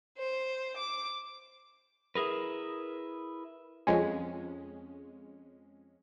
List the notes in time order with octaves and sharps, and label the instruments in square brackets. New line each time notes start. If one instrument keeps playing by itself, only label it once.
[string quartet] C5
D6
[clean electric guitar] E4 G#4 A#4 B4
[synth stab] F2 G#3 C#4